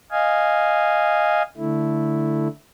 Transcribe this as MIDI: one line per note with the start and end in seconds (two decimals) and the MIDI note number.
0.11 1.42 75
0.11 1.42 77
0.11 1.42 80
1.57 2.48 50
1.57 2.48 57
1.57 2.48 64